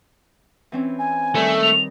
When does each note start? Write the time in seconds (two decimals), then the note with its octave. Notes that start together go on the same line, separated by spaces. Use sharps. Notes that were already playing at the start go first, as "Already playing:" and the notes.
0.72 E3 C4 C#4
0.99 G#5
1.35 D#3 G3 A3
1.63 F7